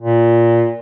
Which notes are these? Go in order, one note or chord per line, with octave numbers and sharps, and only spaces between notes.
A#2